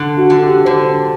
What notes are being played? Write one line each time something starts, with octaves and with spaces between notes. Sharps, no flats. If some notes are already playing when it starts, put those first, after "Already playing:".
Already playing: D3
F#4
D3
G4
D3 C5